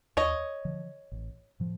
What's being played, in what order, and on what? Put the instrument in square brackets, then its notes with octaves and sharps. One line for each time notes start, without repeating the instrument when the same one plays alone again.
[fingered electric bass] D#2 [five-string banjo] C#5 D#5
[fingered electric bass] D3 F3
A1
A2 F3